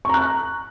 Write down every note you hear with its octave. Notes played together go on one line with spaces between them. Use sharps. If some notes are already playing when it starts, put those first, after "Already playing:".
A#5 C#6 F#6